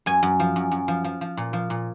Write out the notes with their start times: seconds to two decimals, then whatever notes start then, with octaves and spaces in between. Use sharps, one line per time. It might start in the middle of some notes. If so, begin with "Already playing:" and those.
0.06 F#2 G#5
0.23 F#2
0.40 F3
0.56 F#2
0.72 F#2
0.88 F3
1.04 F3
1.21 F3
1.37 A#2
1.53 F3
1.70 A#2